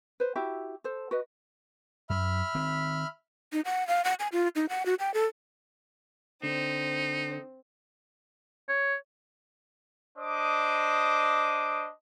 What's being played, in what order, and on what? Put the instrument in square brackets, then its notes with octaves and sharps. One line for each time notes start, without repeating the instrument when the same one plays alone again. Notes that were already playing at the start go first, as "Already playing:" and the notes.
[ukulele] B4 C5
E4 F#4 G4 E5
A4 C5
F#4 B4 D#5
[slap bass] F#2 [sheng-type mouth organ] E5 B5 F6
[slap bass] D#3 C4
[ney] D#4
F#5
F5
F#5
G#5
F4
D#4
F#5
F#4
G5
A4
[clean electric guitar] D3 [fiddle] C4 [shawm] D#4
[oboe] C#5
[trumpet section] D4 C5 D#5 D6 D#6